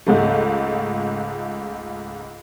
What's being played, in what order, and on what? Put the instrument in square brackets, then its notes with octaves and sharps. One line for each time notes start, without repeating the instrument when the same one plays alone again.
[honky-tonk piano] C#2 G#2 A3